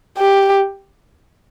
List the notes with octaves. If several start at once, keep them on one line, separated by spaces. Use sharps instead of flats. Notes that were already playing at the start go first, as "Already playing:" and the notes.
G4